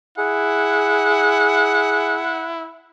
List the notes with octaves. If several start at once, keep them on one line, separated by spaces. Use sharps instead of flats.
E4 G#4 F#5